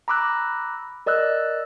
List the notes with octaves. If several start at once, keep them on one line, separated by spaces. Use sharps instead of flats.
A#5 B5 D6 E6 F#6
A#4 D5 D#5 E6 F#6